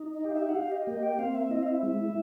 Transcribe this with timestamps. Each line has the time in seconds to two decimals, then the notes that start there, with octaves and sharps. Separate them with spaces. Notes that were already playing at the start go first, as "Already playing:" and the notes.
Already playing: D#4
0.13 D#5
0.24 G4
0.30 F5
0.34 E5
0.49 F#5
0.55 G4 F5
0.71 D#5
0.87 A#3 D#5
1.03 G5
1.19 C4 F5
1.35 E5
1.50 E4 D#5
1.63 F5
1.67 E5
1.83 G#3 E5